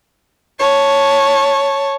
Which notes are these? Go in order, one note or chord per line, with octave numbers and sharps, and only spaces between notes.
C#5 A5